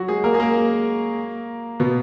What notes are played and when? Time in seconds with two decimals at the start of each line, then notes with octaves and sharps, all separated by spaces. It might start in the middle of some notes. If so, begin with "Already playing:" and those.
Already playing: F#3 F#4
0.08 G#3 G#4
0.24 A#3 A#4
0.34 G#4
0.40 A#3 A#4
1.80 B2 B3